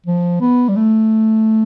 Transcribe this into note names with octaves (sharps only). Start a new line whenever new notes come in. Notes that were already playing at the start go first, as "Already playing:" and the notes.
F3
B3
G3
A3